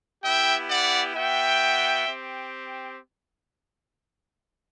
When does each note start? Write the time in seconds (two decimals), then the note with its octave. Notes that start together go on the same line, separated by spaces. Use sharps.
0.24 B3 E4 G4 E5 G5
0.70 D5 F#5
1.15 B3 F#4 E5 G5
2.08 C4 G4